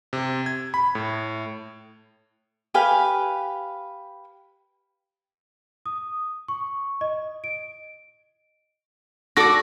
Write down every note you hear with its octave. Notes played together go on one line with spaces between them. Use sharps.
C3
G#6
B5
A2
G4 B4 F5 G#5
D#6
C#6
D#5
D7
F#4 A4 D5 D6 A#6